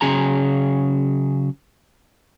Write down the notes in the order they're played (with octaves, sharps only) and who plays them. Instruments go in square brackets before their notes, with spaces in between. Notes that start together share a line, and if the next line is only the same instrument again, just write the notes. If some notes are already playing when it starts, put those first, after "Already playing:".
[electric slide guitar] C#3 F#3 C#4 G#4 G#5 A#5